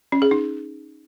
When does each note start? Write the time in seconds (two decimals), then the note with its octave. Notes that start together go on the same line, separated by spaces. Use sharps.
0.12 C#4
0.22 G#4
0.31 D#4